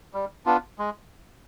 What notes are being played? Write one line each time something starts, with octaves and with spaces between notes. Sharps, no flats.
G3
B3 D4 F4
G#3